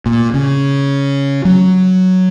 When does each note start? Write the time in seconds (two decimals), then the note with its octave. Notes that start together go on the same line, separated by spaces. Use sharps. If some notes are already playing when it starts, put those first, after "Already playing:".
0.06 A#2
0.34 C#3
1.45 F#3